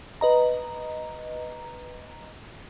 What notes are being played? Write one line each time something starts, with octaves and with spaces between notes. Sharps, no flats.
B4 D#5 A#5